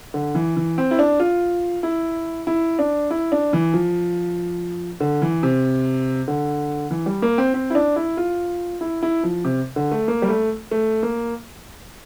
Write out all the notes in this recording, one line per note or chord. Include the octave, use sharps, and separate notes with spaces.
D3
E3
E3
C4
E4
D4
F4
E4
E4
D4
E4
D4
E3
F3
D3
E3
C3
D3
E3
G3
A#3
C4
C4
E4
D4
E4
F4
E4
E4
F3
C3
D3
A3
A#3
G3
A3
A3
A#3